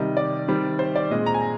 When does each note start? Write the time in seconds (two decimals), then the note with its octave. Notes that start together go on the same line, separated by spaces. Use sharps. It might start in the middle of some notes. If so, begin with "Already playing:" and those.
Already playing: C3 D#3 G3 D#5
0.17 D5
0.48 D#3 G3 C4
0.79 C5
0.96 D5
1.11 A#2 G#3 C4 D#5
1.26 A#5
1.34 G#5
1.42 A#5